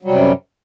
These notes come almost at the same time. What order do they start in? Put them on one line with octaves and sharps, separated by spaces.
F#3 G3 C3 F#2